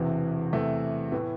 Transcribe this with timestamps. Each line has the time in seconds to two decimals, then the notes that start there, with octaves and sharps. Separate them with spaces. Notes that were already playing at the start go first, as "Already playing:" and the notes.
Already playing: E1 E2 C3 E3
0.53 E2 C3 E3 A3
1.12 A2 E3 B3